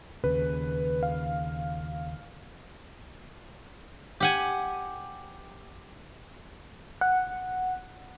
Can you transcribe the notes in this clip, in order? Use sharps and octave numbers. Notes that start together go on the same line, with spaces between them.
D#2 C#3 B4
F5
G4 F#5 G#5
F#5